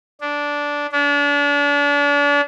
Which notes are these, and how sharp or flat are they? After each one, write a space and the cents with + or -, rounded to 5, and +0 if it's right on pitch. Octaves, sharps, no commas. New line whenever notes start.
D4 -10
D4 -35